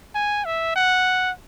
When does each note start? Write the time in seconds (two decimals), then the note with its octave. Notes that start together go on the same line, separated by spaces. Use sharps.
0.15 G#5
0.45 E5
0.76 F#5